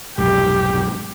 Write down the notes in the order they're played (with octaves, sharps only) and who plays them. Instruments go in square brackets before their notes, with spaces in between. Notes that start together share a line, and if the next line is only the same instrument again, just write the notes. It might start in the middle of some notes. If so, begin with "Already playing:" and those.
[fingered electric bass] F1 B1 G#2 [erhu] G4